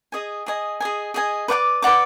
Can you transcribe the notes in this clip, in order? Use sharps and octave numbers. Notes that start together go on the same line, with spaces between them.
G#4 D#5 G#5
G#4 D#5 G#5
G#4 D#5 G#5
G#4 D#5 G#5
B4 D5 F#5 D6
B4 D5 F#5 D6